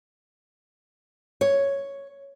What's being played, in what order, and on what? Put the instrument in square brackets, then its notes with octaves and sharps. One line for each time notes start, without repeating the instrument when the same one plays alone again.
[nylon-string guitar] C#5